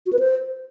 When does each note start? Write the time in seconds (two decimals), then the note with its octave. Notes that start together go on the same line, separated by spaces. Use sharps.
0.06 F#4
0.13 B4
0.19 C5